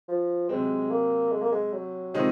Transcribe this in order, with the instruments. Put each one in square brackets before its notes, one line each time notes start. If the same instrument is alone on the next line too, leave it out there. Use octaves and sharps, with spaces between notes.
[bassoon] F3
[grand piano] C3 F#3 C4 [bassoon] G#3
[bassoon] A#3
G#3
A#3
G#3
F#3
[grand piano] C3 D#3 G#3 D#4 [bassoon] F3